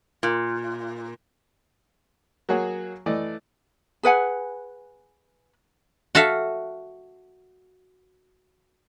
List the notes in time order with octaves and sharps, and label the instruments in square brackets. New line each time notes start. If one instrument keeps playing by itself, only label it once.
[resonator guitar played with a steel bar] A#2
[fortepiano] F#3 A#3 F#4 G#4 C#5
E3 A3 D5 D#5
[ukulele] G#4 B4 F#5 G#5
[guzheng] F#4 A4 E5 F5